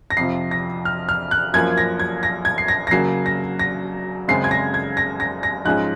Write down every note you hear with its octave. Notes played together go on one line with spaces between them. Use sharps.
A#6
F2 C3 F3 C7
A#6
F6
F6
F#6
F#2 F3 A#3 C#4 G#6
A#6
G#6
A#6
G#6
C7
A#6
A#6
C#3 F#3 A#3 C7
A#6
A#6
F#2 C#3 G#3 C4 C7
G#6
A#6
G#6
A#6
A#6
A#6
G#2 F3 G#3 C#4 F#6